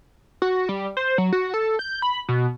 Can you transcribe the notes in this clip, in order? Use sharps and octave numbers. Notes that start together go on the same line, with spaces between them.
F#4
G3
C5
F#3
F#4
A4
G6
B5
B2